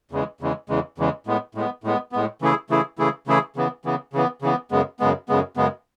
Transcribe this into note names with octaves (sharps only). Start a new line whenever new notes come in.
E2 C#3 E3 G#3
E2 C#3 E3 G#3
E2 C#3 E3 G#3
E2 C#3 E3 G#3
A2 G#3 B3
A2 G#3 B3
A2 G#3 B3
A2 G#3 B3
C#3 E3 A3 E4 G#4
C#3 E3 A3 E4 G#4
C#3 E3 A3 E4 G#4
C#3 E3 A3 E4 G#4
C#3 E3 B3
C#3 E3 B3
C#3 E3 B3
C#3 E3 B3
F#2 C#3 G#3 B3
F#2 C#3 G#3 B3
F#2 C#3 G#3 B3
F#2 C#3 G#3 B3